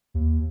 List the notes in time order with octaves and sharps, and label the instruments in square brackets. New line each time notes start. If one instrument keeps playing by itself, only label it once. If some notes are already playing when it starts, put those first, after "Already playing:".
[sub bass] D#2